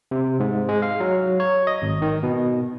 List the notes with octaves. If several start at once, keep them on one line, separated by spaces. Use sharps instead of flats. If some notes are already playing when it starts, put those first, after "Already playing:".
C3
G#2
G#3
F5
F#3
C#5
D#5
G#1
D#3
B2